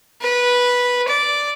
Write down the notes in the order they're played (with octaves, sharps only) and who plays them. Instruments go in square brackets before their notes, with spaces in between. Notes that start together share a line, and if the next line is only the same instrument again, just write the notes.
[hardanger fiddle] B4
D5